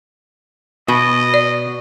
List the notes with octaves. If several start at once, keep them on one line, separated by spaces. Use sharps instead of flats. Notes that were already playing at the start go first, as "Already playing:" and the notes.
B2 D#5
D5